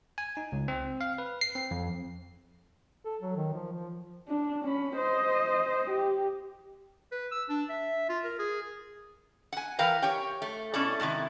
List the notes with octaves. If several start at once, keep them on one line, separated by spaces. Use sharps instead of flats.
G#5
D#4
C#2
C4
F5
B4
C7
C4
F2
A4
F#3
D#3
F3
F3
D4
C#4 B5
C5 D#5
G4
B4
E6
D4
E5
F4
A#4
G#4
F#5 G#5
E3 A#4 B4 F5 G5
G4 C#5 G5
A3
B2 C#4 E4 A4 D5
G#2 C3 D#3 E4